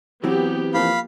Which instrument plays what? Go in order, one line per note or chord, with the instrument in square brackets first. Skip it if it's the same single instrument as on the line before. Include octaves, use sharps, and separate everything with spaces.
[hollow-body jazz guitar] E3 C4 [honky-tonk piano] F#3 [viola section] B3 G4
[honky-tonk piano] F3 A#3 [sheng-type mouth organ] F5 B5